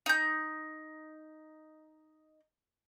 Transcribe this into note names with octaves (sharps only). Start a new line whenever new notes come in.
D#4 G6